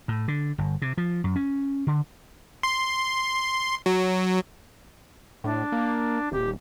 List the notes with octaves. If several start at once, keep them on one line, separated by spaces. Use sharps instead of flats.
A2
D3
G1
C3
F3
F#2
C#4
D3
C6
F#3
A2 D4
A#3
D#1 G4